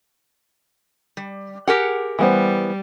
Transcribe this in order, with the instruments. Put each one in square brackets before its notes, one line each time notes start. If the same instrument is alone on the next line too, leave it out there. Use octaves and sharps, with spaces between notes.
[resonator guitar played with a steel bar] G3
[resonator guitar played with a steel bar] G4 A#4 F#5 [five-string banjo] G#4
[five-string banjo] E3 B3 C5 [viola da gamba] G3